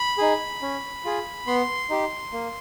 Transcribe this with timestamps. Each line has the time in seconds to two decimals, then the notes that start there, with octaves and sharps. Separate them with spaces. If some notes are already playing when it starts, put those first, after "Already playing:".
Already playing: B5
0.18 D#4 G#4
0.62 C#4
1.04 F4 G#4
1.47 B3 C6
1.90 D#4 G4
2.32 A#3